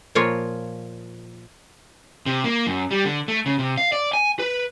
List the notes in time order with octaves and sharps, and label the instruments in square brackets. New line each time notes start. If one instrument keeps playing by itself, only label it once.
[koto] A#2 F3 A#3 F4 C#5
[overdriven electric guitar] C3
A#3
F#2
G3
D3
A3
C#3
C3
F5
D5
G#5
B4